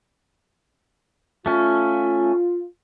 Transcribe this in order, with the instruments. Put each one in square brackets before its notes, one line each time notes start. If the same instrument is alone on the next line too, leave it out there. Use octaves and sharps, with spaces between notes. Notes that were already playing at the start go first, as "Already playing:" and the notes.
[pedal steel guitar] A3 C#4 [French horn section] F4